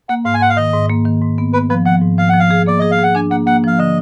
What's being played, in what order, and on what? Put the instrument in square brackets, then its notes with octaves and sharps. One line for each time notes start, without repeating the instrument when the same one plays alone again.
[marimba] A#3 [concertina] F#5
[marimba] G#2 [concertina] F5
[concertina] G#5
[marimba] G#2 [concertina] F#5
[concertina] F5
[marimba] D#3 [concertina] D#5
[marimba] G#2
A#3
D#3
G#2
B3
[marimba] B3 [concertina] B4
[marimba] F3 [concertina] B4
[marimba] F3 [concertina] F#5
[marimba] G#2
[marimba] F3 [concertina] F5
[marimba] F3 [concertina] F#5
[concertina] F5
[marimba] G#4
[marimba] A#3 [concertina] D5
[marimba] G#4 [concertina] D#5
[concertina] F5
[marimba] G#4 [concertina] F#5
[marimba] D4 [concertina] G#5
[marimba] A#3 [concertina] F#5
[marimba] A#3 [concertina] F#5
[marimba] F3 [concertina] F5
[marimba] D3 [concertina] D#5